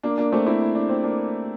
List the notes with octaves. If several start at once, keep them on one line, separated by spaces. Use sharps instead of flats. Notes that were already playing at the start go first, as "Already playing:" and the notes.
A#3 D4
A#3 D4
A3 C4
C4 E4
E4
D4
C4
A#3 D4